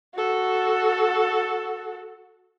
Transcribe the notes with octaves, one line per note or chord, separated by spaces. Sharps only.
F#4 A4